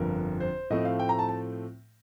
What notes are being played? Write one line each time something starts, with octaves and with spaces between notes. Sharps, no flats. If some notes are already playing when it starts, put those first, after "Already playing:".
Already playing: G1 F2 D3 F3 A#4
C5
A2 F3 A3 C4 D#5
F5
G5
A#5
A5
A5